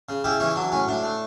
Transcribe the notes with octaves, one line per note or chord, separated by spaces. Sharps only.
C#3
C#3 E4 G4
E3 C#4 E4
F#3 D4
A2 C#4
A2 D4
A3